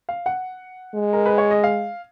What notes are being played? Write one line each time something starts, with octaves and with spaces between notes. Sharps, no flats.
F5
F#5
G#3
A#4
B4
C#5
D#5
F5